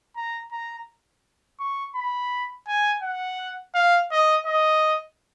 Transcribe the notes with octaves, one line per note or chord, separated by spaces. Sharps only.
A#5
A#5
C#6
B5
G#5
F#5
F5
D#5
D#5